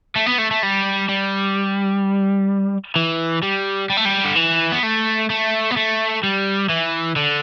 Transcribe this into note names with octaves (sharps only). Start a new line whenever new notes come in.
A3
B3
A3
A3
G3
G3
E3
G3
G3
A3
G3
D3
E3
B3
A3
A3
B3
A3
G3
E3
D3